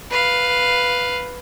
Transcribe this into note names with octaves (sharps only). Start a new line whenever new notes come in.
B4 F5